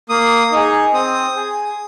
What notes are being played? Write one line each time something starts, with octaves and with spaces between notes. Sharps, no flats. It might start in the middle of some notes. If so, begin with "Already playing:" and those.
A#3 D#6
D#4 G#4
C4 D#6
G#4